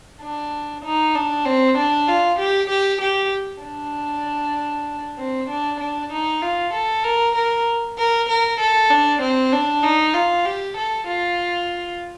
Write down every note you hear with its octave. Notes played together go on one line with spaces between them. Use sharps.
D4
D#4
D4
C4
D4
F4
G4
G4
G4
D4
C4
D4
D4
D#4
F4
A4
A#4
A#4
A#4
A#4
A4
D4
C4
D4
D#4
F4
G4
A4
F4